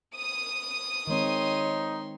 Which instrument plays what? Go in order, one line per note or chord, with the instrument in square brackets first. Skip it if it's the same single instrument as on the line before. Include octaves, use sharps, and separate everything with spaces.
[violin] D#6 D#7
[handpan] D#3 G#3 C4 [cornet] D#4 [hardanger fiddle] C#5 C6